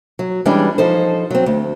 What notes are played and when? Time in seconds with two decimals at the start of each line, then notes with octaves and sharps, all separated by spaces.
0.19 F#3
0.45 E3 G3 G#3 C#4 D4
0.78 F3 D#4 A4 C5
1.31 F#3 C4
1.46 D2